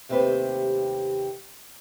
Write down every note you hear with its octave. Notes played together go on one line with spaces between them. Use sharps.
D#2 C3 A3 G4 B4 C5